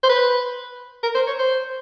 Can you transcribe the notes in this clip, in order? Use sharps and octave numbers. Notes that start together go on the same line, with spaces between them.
C5
B4
A#4
C5
C#5
C5